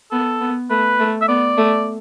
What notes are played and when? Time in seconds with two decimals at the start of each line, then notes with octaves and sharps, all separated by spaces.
0.11 B3 A4
0.41 B3
0.70 A3 B4
1.00 A3
1.21 E5
1.28 B3 D5
1.58 A3